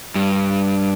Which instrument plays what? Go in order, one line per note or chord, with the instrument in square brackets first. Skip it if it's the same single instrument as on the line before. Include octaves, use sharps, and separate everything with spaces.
[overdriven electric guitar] G2